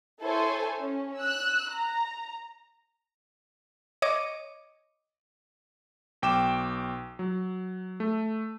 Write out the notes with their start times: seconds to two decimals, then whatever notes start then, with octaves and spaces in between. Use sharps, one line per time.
0.21 E4 A4 C5 C#5 G#5
0.79 C#4
1.17 E6 F#6
1.70 A#5
4.02 C#5 D#5 D6
6.22 B1 G5 D6 E7
7.19 F#3
8.00 A3